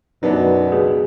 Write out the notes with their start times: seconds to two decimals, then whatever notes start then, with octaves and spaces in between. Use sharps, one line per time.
0.23 F#2 B2 F#3 B3 D4 D#4
0.72 C#2 G#4